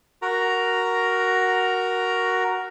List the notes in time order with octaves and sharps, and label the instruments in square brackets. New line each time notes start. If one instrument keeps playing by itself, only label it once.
[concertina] F#4 A#4 A#5